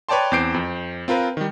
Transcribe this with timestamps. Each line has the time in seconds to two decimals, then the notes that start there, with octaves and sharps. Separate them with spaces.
0.09 B4 C#5 D5 G5 A5 C6
0.32 E2 C4 D6 G6 C7 D7
0.54 F2
1.08 C4 F4 A#4 B4
1.37 D#3 G3